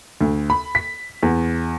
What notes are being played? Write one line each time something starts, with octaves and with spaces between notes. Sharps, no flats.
D2
B5
B6
E2